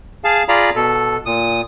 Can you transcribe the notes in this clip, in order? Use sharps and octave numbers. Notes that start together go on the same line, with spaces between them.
G#4 F5 A5
F4 G#4 D5 F5 A#5 B5
B2 A4
A#2 D#6